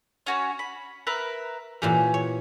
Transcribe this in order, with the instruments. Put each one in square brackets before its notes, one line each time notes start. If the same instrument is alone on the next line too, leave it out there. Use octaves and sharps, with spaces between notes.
[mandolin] C#4 F#4 C#5
B5
A#4 B4 E5
[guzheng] A#2 E3 G4 [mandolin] C#4
[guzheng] C#5